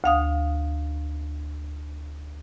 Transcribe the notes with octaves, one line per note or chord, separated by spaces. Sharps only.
D2 F5 D#6